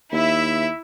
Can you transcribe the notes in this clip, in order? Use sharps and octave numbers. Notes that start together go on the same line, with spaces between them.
D#2 E4 E5